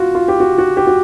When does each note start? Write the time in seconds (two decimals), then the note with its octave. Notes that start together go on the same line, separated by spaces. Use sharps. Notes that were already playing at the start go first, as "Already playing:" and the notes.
Already playing: F4 F#4
0.15 F4
0.28 G4
0.40 F#4
0.58 F#4
0.77 G4
0.87 F#4